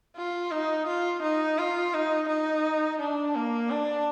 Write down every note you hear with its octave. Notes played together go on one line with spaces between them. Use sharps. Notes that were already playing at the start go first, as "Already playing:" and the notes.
F4
D#4
F4
D#4
F4
D#4
D#4
D4
A#3
D4